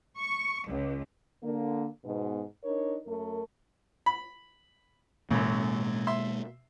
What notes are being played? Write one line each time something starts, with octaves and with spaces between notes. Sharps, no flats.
C#6
C#2
D3 A#3
G#2 B2
D4 D#4 A#4 C#5
F#2 A3 A#4
B5
A1 F#2 B2 G#3 A#3
E5 C6